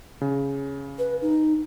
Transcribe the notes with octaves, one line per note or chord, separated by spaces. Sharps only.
C#3
B4
D#4